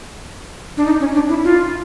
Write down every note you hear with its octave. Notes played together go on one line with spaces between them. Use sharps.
D4
D#4
C#4
D4
E4
F4